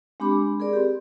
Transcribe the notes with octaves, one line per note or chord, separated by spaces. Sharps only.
G#3 C4 D4 G4 B5 D6
G#4 A#4 D5
C4 G4